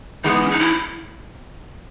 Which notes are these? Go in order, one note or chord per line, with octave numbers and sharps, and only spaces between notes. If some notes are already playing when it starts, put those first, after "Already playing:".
E3 G#3 B3 D#4
C#4
D#4
E4